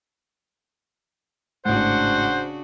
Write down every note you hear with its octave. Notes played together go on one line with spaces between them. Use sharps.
G#1 A2 C#3 D4 F#4 C5 F#5